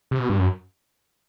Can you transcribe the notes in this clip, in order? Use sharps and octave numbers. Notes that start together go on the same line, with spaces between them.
C3
B2
G2
F#2